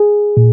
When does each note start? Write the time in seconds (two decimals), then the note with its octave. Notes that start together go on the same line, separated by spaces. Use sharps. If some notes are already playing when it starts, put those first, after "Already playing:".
Already playing: G#4
0.37 A#2